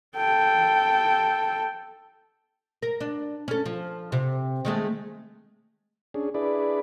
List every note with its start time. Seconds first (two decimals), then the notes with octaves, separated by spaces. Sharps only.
0.16 A4 G5
2.82 A#4
3.00 D4
3.48 C#4 A4
3.66 F3
4.12 C3
4.65 D#3 G#3 A3
6.14 C#4 D4 G#4
6.34 D4 E4 G#4 B4 D5